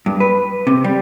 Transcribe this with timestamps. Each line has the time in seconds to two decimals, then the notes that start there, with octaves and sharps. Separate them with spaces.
0.06 G2
0.20 B4
0.67 C3
0.84 G3